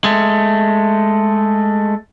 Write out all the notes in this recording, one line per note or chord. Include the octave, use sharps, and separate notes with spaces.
G#3 A3